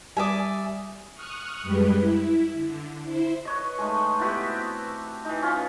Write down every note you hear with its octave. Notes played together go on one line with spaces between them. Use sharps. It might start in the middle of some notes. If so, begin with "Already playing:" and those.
G3 D5 E5 G#5 D#6
C#6 D#6 F6 F#6
F#2 G3 G#3 G4 B4
E4
D3
E4 C5
B4 C#5 D#5
G#3 A3 D#4
B3 E4 F#4 G4
C4
E3 D#4
C#4 F4